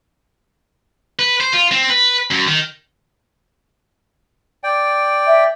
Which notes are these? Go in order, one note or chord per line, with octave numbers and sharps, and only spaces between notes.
B4
C5
F4
C4
B4
F#2
D#3
D5 G5
E5